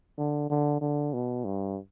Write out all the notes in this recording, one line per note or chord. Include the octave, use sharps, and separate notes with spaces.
D3
D3
D3
B2
G2